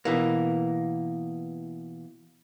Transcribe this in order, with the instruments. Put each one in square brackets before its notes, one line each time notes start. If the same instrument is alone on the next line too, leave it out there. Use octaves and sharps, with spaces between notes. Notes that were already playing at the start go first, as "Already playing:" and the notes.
[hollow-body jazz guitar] B2 E3 A#3